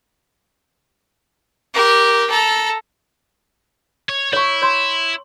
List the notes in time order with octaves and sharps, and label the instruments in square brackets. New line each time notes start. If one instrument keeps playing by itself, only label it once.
[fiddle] G4 A#4
A4 A#5
[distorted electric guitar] C#5
[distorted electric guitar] E4 [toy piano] C#5 C#6
[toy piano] C#5 C6